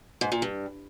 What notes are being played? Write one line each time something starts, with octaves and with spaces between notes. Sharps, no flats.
G#2
A#2
G2